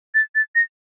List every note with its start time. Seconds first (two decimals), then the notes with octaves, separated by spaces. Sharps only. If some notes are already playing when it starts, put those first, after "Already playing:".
0.15 A6
0.35 A6
0.55 A#6